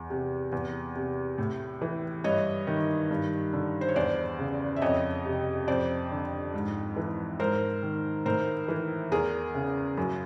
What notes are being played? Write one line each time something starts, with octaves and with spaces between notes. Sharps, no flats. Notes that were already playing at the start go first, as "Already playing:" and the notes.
Already playing: E2
C3
E2
C3
A2
E3
G2 C#5 D#5
D#3
G2
D3
C5
C#5
E2 C5 D5
C#3
E5
F2 C#5 D#5
C3
F2 C5 D5
D3
G#2
E3
G#2 A#4 C5
D#3
A2 A#4 C5
E3
E2 G#4 A#4
C#3
F#2